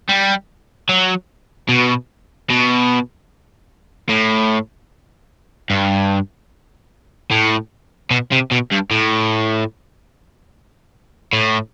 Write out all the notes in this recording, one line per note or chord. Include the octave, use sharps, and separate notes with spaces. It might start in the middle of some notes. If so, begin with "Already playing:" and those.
G3
F#3
B2
B2
A2
G2
A2
B2
C3
B2
G2
A2
A2